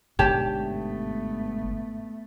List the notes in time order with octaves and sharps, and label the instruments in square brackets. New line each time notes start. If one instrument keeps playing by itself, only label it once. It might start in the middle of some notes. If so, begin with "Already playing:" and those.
[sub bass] G1 [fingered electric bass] G#2 B2 D3 [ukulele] G4 C#5 A5
[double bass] A3 B3